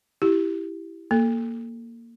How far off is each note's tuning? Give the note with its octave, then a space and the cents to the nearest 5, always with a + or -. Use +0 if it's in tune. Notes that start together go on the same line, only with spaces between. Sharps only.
E4 +0 G4 -5
A#3 +0 A4 +0